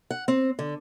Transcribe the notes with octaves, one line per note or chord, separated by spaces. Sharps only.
F#5
C4
D3